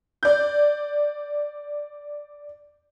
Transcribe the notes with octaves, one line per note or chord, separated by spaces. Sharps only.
D5 G6